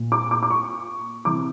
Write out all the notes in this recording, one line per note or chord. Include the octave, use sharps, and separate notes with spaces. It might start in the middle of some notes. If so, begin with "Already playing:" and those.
Already playing: A#2
D6
D6
D6
C#6
C3 E3 D6